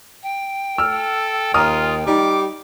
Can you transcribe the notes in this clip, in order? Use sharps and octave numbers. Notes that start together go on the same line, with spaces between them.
G5
A4 E6 F6
D#2 F4 A#5 D#6 F6
G3 D#4 D6